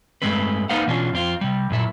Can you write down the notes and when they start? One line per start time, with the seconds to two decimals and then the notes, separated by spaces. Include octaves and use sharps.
0.22 G2 C#3 G#3 A3 C4 B4
0.69 A#3 D#4 B4 C5 F5 F#5
0.87 B2 E3 C#4 D4 F4
1.13 F2 C4 F4
1.41 C3 G3
1.70 F#2 A#2 E4